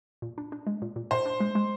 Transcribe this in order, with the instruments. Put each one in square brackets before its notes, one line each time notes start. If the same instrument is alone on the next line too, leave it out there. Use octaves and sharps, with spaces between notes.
[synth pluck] A#2
D4
D4
G#3
A#2
A#2
[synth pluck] A#2 [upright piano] C5
[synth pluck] D4
G#3
G#3